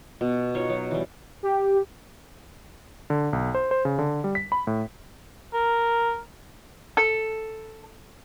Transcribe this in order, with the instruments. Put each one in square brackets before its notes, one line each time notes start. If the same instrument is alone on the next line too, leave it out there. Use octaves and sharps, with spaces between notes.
[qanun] B2
D#4 F4 C#5
F#3
E3 G3
[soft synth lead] G4
[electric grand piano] D3
B1
C5
C5
C#3
D3
G3
B6
B5
A2
[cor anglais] A#4
[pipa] A4